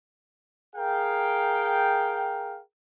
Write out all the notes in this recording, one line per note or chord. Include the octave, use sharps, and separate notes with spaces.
G#4 A#4 F5 G5